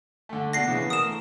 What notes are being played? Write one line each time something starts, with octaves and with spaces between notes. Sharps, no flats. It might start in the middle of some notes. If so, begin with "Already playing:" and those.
D3 A3
B2 D4 F#5 A#6 C7
C#3 E3
A#4 D#6 E7
A3